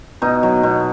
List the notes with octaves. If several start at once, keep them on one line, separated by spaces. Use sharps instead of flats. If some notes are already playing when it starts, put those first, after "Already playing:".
B2 D#4
F#3
B2